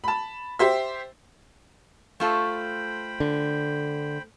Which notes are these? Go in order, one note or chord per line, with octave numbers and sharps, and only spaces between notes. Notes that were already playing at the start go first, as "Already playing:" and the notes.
A5 B5
G4 C5 E5
A3 F4 A4 C5 G5 B5
D3